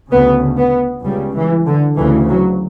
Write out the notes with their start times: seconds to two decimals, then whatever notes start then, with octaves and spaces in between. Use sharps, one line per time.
0.11 D2 C#3 B3
0.58 B3
1.04 C#2 C#3 G3
1.35 E3
1.66 D3
1.97 D2 C#3 E3
2.29 F#3